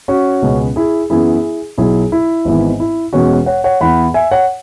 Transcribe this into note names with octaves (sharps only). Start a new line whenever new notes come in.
C#4 F#4
C#2 B2 G#3 B3
E4 G#4
F#2 E3 B3 E4 G#4
B1 B2 F#3 E4 G#4
E4
G#1 G#2 E3 B3
E4
E1 E2 B2 G#3 C#4 F#4
C#5 F#5
C#5 F#5
E2 E3 B3 F#5 B5
E5 G#5
C#5 F#5